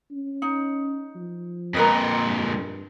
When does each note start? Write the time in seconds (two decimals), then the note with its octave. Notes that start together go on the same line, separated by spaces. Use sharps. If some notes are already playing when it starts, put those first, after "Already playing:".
0.11 C#4
0.42 D#4
1.15 F3
1.74 F2 A#2 A#4 B4 D#5
2.25 G2